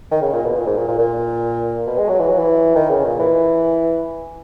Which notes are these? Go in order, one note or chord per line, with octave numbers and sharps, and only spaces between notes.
D#3
C#3
A#2
B2
A#2
G#2
A#2
A#2
A#2
B2
G#3
F#3
E3
F#3
E3
D#3
C#3
A#2
E3